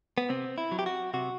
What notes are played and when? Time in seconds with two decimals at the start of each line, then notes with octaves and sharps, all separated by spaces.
0.18 B3
0.29 C3 C4
0.58 E4
0.72 F#3
0.79 G4
0.86 F#4
1.14 C3 F#4